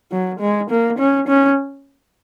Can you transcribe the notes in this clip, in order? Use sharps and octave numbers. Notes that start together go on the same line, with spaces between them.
F#3
G#3
A#3
C#4
C#4